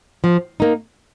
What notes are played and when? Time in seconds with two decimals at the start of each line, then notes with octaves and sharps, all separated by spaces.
0.24 F3
0.60 A#3 D#4